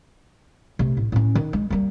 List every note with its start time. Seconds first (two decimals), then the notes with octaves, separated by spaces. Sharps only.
0.79 C3 A3
0.97 A2
1.12 A2 C#4
1.35 D#3
1.53 G#3
1.70 G3 A#3